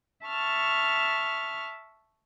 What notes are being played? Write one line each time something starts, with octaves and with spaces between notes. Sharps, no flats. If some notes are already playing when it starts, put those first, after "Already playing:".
E5 A5 C#6 F6